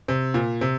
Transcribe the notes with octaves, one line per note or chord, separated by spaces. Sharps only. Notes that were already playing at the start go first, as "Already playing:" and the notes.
C3
A#2
C3